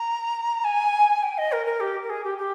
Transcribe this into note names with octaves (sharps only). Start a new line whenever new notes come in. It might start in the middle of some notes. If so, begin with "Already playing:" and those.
Already playing: A#5
G#5
G5
D#5
A#4
A#4
G4
A#4
G#4
G4
G4